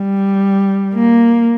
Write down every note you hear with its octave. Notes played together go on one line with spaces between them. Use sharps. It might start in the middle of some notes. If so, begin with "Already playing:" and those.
Already playing: G3
A#3